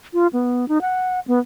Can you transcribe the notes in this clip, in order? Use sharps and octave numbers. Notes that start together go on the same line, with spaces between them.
F4
B3
D#4
F#5
B3